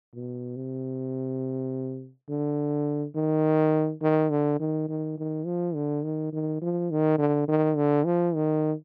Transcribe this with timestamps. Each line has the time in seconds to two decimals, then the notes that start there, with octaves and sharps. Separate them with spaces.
0.14 B2
0.56 C3
2.29 D3
3.15 D#3
4.02 D#3
4.30 D3
4.60 D#3
4.89 D#3
5.18 D#3
5.45 F3
5.75 D3
6.04 D#3
6.33 D#3
6.62 F3
6.90 D#3
7.18 D3
7.48 D#3
7.76 D3
8.05 F3
8.34 D#3